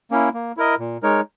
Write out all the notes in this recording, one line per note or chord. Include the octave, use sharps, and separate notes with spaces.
A#3 C#4 E4
A#3
E4 A#4 D#5
A#2
G#3 D#4 A#4 C#5